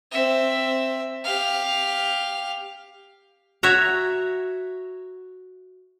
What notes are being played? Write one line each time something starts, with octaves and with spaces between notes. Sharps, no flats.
C4 E5
G4 F5
F#4 C#5 E5 F#5 A#5